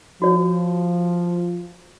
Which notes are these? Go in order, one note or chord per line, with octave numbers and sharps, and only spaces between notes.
F3 F#4 C#5